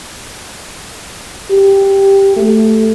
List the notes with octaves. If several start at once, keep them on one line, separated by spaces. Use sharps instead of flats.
G4
A3